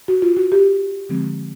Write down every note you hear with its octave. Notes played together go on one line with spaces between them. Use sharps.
F#4
F4
F#4
G4
D3 F3 G#3 C4